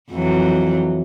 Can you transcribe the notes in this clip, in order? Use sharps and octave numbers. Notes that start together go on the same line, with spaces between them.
F2 E3 F#3